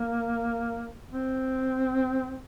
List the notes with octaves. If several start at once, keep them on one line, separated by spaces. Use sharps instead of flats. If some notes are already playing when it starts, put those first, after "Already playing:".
Already playing: A#3
C4